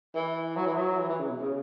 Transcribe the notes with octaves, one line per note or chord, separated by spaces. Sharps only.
E3
F#3
E3
F#3
E3
E3
C#3
B2
C#3